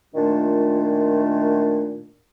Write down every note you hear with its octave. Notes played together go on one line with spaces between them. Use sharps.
A#2 D#3 A3 D4 F4